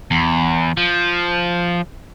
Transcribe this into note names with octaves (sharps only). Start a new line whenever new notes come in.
E2
F3